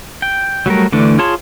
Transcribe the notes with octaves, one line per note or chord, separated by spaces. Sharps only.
G5
F#3 G3 A3 A#4
D3 E3 A3 D4
F4 G#4 C#5 A5 C6